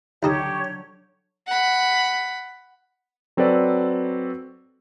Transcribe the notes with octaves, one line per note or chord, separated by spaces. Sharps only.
D#2 D3 F#3 D#4 G4 A4 C#5
F#5 B5
F#3 C4 A4 B4 D5